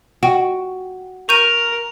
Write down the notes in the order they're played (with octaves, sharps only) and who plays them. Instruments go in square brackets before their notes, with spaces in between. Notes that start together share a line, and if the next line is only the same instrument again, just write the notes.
[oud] F#4 [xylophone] G5
[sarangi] A#4 [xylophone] C#6 G6 D#7 [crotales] F7